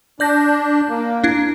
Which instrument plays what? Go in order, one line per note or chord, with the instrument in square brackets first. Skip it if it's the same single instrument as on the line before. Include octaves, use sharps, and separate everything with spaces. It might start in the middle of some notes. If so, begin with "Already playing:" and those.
[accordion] D4 [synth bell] D5 G6 A#6
[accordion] A#3
[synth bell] D4 E4